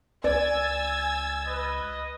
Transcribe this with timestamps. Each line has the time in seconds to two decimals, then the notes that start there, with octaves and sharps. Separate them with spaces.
0.24 C#2 D5 G#5 E6 G#6 A6
1.44 B4 D#5